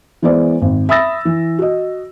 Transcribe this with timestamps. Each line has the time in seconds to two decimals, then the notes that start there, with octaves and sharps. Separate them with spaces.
0.22 E3 G#3 B3 C5 D5
0.62 G#1
0.89 E5 B5 D#6 E6 A6 A#6
1.25 E3
1.59 F#4 D#5